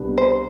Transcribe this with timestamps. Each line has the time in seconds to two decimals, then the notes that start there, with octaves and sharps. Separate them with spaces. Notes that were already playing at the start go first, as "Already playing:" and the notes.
Already playing: C2 B2 G3 B3 D4
0.18 C5